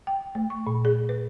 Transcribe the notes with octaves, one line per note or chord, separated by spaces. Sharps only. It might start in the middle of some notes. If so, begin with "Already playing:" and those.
G5
A3
C#6
A#2
G#4
B4